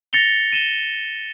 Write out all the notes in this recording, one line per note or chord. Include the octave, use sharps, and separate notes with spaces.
A6 A#6 C#7 F7 G7
D#7 E7 G7